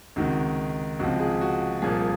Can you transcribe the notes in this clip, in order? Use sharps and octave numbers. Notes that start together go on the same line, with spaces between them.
C#2 C3 D#3 F#4
C#2 C3 F3 F#4
G#4
F#4
C2 A#2 F3 G#4